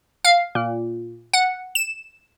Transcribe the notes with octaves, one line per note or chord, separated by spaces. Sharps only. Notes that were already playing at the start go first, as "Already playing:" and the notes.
F5
A#2
F#5
E7